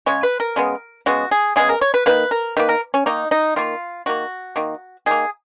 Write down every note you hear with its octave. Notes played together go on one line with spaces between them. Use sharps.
C#3 G#3 C#5
B4
A#4
C#3 G#3 B3
C#3 G#3 B3 F#4
G#4
C#3 G#3 B3 G#4
A#4
C#5
B4
D#3 A#3 B4
A#4
D#3 A#3 B4
A#4
C#4
D#3 A#3 D#4
D#4
D#3 A#3 F4
D#3 A#3 F#4
D#3 A#3
D#3 A#3 G#4